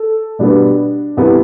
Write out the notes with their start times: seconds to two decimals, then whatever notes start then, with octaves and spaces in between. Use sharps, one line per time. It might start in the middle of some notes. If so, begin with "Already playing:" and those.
Already playing: A4
0.39 B2 G3 B3 D4
1.17 C2 C3 E3 B3